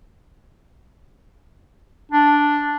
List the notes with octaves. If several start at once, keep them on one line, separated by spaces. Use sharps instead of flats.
D4